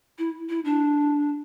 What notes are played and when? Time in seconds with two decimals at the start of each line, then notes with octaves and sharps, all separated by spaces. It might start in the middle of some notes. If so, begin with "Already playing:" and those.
0.19 E4
0.49 E4
0.65 D4